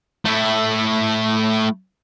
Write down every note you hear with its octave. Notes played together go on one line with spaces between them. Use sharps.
A3 E4